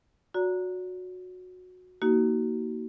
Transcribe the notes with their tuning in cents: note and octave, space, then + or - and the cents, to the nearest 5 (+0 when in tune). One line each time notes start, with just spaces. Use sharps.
F#4 -20 D5 -40 A#5 +0
A#3 +0 D#4 +15 F#4 +30